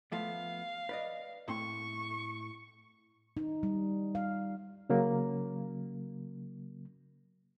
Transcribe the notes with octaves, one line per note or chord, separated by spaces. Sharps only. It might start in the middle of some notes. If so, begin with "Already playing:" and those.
F3 A3 B3 F5
B4 D5 D#5
A2 C4 C6 C#6
D#4
G3
F5
C#3 F#3 A#3